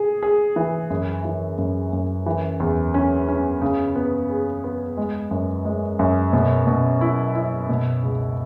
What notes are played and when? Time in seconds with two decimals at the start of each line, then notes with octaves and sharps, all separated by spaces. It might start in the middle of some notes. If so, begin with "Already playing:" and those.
Already playing: G#4
0.23 G#4
0.56 E3
0.90 F#2
1.25 E3
1.58 F#2
1.93 F#2
2.26 E3
2.60 E2
2.94 C#4
3.28 C#4
3.62 C#3
3.95 B3
4.30 G#4
4.64 B3
4.97 G#3
5.31 F#2
5.65 G#3
5.99 F#2
6.33 B2
6.67 B2
7.01 E4
7.35 E4
7.69 B2
8.03 C#2